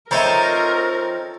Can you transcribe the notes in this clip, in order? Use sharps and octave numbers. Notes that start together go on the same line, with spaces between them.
F3 C4 D#4 A4 A#4 C#5 E5 A#5